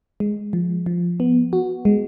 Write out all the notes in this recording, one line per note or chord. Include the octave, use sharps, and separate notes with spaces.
G#3
F3
F3
B3
F#4
G#3